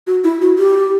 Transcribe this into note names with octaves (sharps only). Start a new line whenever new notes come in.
F#4
E4
F#4
G4